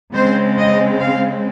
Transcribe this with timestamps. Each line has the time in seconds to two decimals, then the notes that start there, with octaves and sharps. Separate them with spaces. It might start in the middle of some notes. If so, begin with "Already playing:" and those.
0.14 C#3 G#3 C4 C5
0.58 D#5
1.00 F5